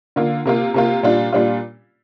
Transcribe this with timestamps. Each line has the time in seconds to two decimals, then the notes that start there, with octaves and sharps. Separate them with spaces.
0.16 D3 A#3 F4
0.45 C3 A#3 F4
0.74 C3 A#3 F4
1.03 A#2 G3 D4 F4
1.33 A#2 G3 D4 F4